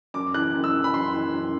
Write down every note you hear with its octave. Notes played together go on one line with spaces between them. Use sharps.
F#2 D6
E3 F#6
F#2
E6
E3
B5
F#2 C6
E3
F#2